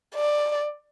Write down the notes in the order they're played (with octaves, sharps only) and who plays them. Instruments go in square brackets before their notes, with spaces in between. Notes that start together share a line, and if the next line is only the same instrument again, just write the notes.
[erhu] D5